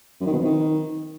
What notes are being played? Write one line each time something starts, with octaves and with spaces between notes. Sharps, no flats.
F#2
D#3
B2
F2
D#3